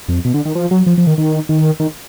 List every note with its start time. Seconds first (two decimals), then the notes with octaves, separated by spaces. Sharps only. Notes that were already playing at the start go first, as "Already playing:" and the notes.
0.08 F2
0.25 B2
0.34 D3
0.45 D#3
0.55 F3
0.71 F#3
0.86 F3
0.98 F3
1.07 D#3
1.18 D#3
1.49 D#3
1.80 D#3